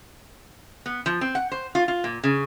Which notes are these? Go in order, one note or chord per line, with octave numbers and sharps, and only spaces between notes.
B3
F3
C4
F#5
C5
F4
F4
A#2
C#3